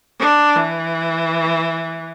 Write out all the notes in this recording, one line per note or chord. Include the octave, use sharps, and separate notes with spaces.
D4
E3